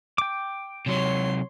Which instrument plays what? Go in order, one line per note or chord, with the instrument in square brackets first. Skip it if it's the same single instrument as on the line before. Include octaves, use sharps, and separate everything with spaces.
[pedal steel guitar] G5 D6
[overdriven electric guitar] C3 F#3 [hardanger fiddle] C#5 C6